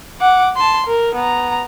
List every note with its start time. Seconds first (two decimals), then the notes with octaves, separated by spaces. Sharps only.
0.21 F#5 D6
0.56 A5 C6
0.86 A#4
1.15 B3 A#5